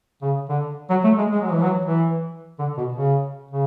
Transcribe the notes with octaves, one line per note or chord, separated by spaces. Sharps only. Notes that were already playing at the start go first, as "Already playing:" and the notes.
C#3
D3
F#3
A3
G#3
G#3
F#3
E3
F#3
E3
D3
B2
C#3
C#3